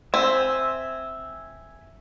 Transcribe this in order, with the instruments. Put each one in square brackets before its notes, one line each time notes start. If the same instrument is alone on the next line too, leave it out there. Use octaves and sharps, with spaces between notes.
[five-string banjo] C4 [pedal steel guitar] E5 G#5